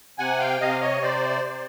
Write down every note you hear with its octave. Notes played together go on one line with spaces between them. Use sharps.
C3 F#5 G#5
F5 G5
C3 D#5 F5
C#5 D#5
C3 C5 D5
C3